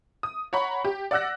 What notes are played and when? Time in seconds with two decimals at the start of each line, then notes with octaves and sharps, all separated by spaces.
0.23 D#6
0.53 C#5 F#5 A#5 B5 C#6
0.85 G4
1.11 D5 F#5 E6 F#6 A#6